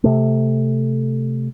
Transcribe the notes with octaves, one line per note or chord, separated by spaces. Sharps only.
C3 A3